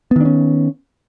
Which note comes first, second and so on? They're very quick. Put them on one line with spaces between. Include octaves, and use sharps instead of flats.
B3 D#3 D4 C#4